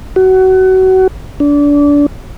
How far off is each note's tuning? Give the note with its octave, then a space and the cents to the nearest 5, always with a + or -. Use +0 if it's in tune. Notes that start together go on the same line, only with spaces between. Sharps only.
F#4 +25
D4 -25